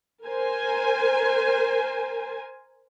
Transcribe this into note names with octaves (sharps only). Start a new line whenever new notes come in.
A#4 C5 G#5